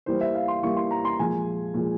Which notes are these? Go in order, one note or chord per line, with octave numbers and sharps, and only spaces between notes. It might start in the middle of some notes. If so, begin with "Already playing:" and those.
E3 G3 A#3 C5
E5
F5
C6
E3 G3 A#3 C#6
C6
A#5
C6
A#2 F3 G#3 G#5
A#2 F3 G#3